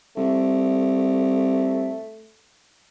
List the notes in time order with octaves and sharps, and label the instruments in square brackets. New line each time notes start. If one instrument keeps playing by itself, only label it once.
[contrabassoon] C2 [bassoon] A3